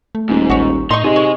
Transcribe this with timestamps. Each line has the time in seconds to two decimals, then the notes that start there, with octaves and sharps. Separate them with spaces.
0.15 A3
0.29 D#1 G#2
0.50 A1 F#4 C#5
0.91 A2 D#4 C6 C#6
1.04 C3 D#4 G#4 D#5
1.16 C#5